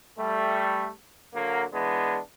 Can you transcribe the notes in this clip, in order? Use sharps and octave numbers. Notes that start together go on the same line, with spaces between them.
G3 A3
D3 F#3 A#3
E3 G#3 B3 D4